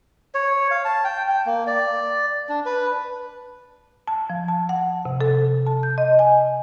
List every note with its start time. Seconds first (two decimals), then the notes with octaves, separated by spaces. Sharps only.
0.35 C#5
0.71 F5
0.85 A5
1.04 G5
1.29 G5
1.46 A#3
1.67 D5
2.49 D4
2.66 B4
4.08 A5
4.30 F3
4.48 A5
4.69 F#5
5.05 C3
5.21 A4
5.67 A5
5.83 G6
5.98 D#5
6.19 G#5